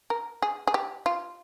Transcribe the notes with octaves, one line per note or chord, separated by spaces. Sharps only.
A#4
G#4
G#4
G4
F4